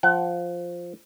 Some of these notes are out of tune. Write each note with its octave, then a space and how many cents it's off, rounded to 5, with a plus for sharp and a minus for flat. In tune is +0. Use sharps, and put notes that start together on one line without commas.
F3 +0 F#5 +30